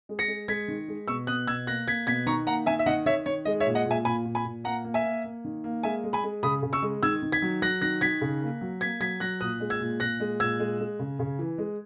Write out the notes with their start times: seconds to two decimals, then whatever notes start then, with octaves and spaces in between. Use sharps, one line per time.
0.09 G#3
0.19 A#6 C#7
0.28 G#3
0.48 G#3 G#6 B6
0.68 D#3
0.88 G#3
1.08 B2 C#6 E6
1.27 B2 D#6 F#6
1.47 B2 E6 G#6
1.67 A#3 F#6 A#6
1.87 A#3 G#6 B6
2.07 B2 G#6 B6
2.26 D#3 A#5 C#6
2.47 A#3 F#5 A#5
2.66 D#3 E5 G#5
2.79 E5
2.86 D#3 D#5 F#5
3.06 D#3 C#5 E5
3.26 D#3 C#5
3.45 G#3 D#5
3.60 C#5 E5
3.66 A#2
3.75 D#5 F#5
3.85 A#2
3.91 E5 G#5
4.05 A#2 G#5 B5
4.25 A#2
4.35 G#5 B5
4.45 A#2
4.64 A#3 F#5 A#5
4.85 A#3
4.94 E5 G#5
5.04 A#3
5.24 A#3
5.45 D#3
5.64 A#3
5.83 G#3 E5 G#5
6.04 G#3
6.13 G#5 B5
6.23 G#3
6.43 C#3 B5 D#6
6.63 C#3
6.73 C#6 E6
6.82 G#3
7.03 D#3 E6 G#6
7.23 D#3
7.32 G#6 B6
7.42 F#3
7.62 F#3 F#6 A#6
7.81 D#3 F#6 A#6
8.01 D#3 G#6 B6
8.21 C#3
8.41 A#3
8.61 F#3
8.81 A#3 G#6 B6
9.00 F#3 G#6 B6
9.20 F#3 F#6 A#6
9.41 A#2 D#6 F#6
9.60 G#3
9.70 E6 G#6
9.80 A#2
10.00 A#2 F#6 A#6
10.20 G#3
10.40 A#2 E6 G#6
10.59 G#3
10.80 G#3
10.99 C#3
11.19 C#3
11.39 E3
11.58 G#3